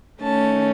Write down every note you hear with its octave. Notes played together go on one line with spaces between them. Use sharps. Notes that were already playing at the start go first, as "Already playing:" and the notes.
D#3 A3 C#4 A5